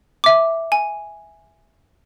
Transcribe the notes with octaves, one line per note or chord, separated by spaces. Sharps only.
E5 D6
G#5